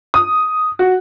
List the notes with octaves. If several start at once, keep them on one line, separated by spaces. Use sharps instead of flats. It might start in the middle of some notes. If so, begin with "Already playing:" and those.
D#6
F#4